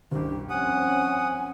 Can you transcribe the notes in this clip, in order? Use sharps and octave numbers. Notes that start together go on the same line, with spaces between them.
F#1 C2 G2 G4
F3 C4 C#4 F#5 G#5 D#6